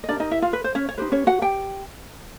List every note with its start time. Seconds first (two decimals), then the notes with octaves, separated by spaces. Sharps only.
0.04 D#5
0.09 D4 D#4 G4 A#4 D5
0.20 D#4 D#5
0.31 E4 E5
0.42 F4 F5
0.53 B4
0.64 C5
0.75 C#4 C#5
0.89 C#5
0.98 D#4 G4 B4 C5
1.12 C#4 C#5
1.27 F#4 F#5
1.42 G4 G5